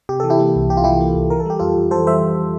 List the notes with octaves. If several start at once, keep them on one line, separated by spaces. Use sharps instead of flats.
C3 G4
E3 A4
E4 G4
A#3
C2
C3 G4
F4
E3 E4 G4
A#3
C2
E3 A#4
A4
G3 G4
F2 F4 A4
F2
E3 A4 C5
G3 C5 E5
F2